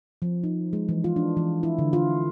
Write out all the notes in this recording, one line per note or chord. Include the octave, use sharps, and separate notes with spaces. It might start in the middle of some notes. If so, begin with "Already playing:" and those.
F3
D#4
G#3
E3
F4
D4
E3
E4
D3
F4